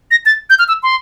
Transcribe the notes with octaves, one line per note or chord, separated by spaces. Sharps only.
A#6
A6
G6
F6
E6
C6